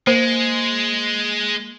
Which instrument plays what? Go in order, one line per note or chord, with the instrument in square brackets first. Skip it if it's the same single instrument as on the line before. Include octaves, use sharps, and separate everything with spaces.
[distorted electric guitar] G#3 [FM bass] A#3 [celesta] C5